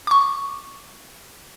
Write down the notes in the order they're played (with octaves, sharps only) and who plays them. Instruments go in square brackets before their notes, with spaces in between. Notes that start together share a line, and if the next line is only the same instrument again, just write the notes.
[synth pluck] C#6 D6